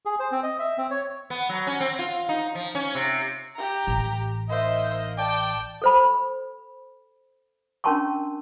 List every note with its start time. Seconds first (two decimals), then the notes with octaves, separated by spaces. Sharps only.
0.06 G#4
0.20 C5
0.32 C4
0.43 D#5
0.59 E5
0.78 C4
0.91 C#5
1.30 B3
1.49 F#3
1.67 C#4
1.80 C4
1.99 F4
2.29 D#4
2.55 F3
2.75 C#4
2.95 C3
3.55 G4 A#5
3.87 A1
4.49 A#3 D#4 C5 D#5 E5
5.18 D5 G5 A5
5.82 A4 C5 B5
7.84 C#4 D4 A#4 A5 C6 C#6